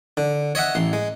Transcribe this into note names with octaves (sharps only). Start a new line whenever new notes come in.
D3
C#5 D#5 E5 F#5
A1 C6
G#3